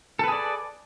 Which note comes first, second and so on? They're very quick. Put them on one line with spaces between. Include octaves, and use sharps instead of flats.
A4 B4 G#4 D5